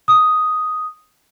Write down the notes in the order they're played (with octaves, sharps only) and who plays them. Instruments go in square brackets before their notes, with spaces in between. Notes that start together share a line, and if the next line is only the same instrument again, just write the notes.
[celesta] D#6